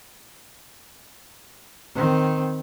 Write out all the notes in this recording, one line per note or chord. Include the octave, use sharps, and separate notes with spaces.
D#3 C4